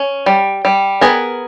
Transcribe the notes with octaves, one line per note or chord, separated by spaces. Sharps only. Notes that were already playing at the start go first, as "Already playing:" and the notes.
Already playing: C#4
G3
G3
B3 G#4 A#4